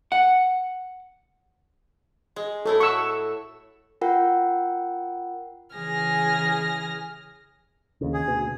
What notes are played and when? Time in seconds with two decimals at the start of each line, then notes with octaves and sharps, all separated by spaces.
0.12 F#5
2.36 G#3
2.65 A2 A3 E4 A4
2.80 F#4 E5 C#6 E6
4.01 F4 A#4 F#5 G5
5.74 C#3 E3 G#4 G#5 F6 A#6
8.01 D#2 C#3
8.14 G#4
8.28 D2 B2